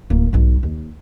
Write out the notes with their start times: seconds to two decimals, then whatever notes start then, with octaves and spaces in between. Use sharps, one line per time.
0.10 D1 A#3
0.33 B1 G#2
0.63 D#2